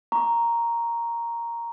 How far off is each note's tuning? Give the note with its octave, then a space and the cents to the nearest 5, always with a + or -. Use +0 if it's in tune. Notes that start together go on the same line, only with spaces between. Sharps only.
A#5 +0 C#6 +0